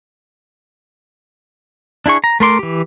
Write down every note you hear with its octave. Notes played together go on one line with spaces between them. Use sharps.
D4 E4 G#4 C#6
A#5
A3 A#4 C6 D6
E3 G4